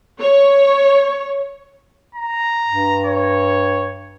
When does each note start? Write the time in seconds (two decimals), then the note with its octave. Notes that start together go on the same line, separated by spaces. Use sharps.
0.21 C#5
2.15 A#5
2.67 G2
3.06 C#5